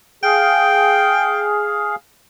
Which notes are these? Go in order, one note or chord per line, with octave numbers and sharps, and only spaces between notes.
G#4 F5 G5